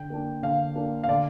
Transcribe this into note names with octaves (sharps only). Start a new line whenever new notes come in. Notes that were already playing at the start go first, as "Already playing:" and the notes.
Already playing: D3 G5
A#3 D4
D3 F5
A#3 D4
F5
D3 D5